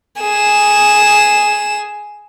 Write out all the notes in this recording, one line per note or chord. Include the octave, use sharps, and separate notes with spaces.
G#4 E7